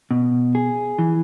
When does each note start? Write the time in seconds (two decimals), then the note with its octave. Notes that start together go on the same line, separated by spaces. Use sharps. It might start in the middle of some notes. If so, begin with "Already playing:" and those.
0.11 B2
0.55 G#4
0.98 E3